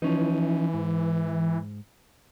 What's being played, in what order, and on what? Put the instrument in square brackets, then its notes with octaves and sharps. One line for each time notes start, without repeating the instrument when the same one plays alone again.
[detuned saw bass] E3 [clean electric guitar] F3 C#4 D#4
[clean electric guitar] G#2